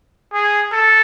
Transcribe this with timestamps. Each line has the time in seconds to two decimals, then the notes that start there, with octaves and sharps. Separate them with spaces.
0.33 G#4
0.72 A4